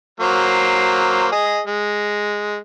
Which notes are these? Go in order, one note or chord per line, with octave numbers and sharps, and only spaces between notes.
F#3 A#3 C5
G#4 D#5
G#3